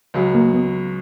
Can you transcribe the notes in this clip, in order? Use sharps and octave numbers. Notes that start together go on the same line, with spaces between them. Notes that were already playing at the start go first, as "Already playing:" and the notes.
C#2 C#3 F#3
A#3
B3